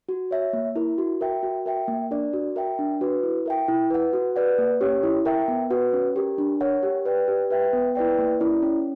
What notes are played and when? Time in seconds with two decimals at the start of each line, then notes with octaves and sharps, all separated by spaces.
0.09 F#4
0.31 C#5 E5
0.53 A#3
0.76 E4 A#4
0.98 F#4
1.21 A#4 E5 G5
1.43 F#4
1.66 A#4 E5 G5
1.88 A#3
2.11 D4 A#4 D5
2.33 F#4
2.56 A#4 E5 G5
2.79 D4
3.01 F#4 B4
3.23 E4
3.46 A#4 E5 G5
3.68 E4
3.90 B4 F#5
4.13 F#4
4.36 B4 D5 F#5
4.58 A#3
4.81 C#4 G4 C#5
5.03 E4
5.26 A#4 E5 G5
5.48 B3
5.71 F#4 B4 F#5
5.93 C#4
6.16 G4 A#4
6.38 D4
6.61 A#4 C#5 F#5
6.83 G4
7.05 B4 D5 G5
7.28 G4
7.51 B4 E5 G5
7.73 B3
7.95 E4 B4 D5 G5
8.18 A#3
8.40 C#4 E4 A#4 D5
8.63 C#4